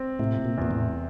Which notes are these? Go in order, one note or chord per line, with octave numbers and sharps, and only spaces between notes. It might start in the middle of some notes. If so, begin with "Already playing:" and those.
Already playing: C4
A2 C3
A#2
E2 A#2
A2